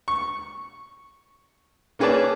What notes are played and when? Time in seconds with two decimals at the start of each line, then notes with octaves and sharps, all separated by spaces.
0.08 C#6
1.99 A#3 C#4 G#4 B4 D5 A5